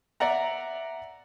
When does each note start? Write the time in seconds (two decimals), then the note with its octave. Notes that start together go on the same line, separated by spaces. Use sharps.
0.20 D5 E5 F#5 A#5